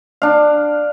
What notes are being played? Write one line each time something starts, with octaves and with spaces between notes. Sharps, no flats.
D4 F5